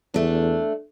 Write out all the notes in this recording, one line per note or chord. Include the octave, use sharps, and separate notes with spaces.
E2 A3 D4